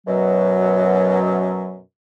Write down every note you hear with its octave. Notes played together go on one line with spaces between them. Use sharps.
F#2 B2 F#3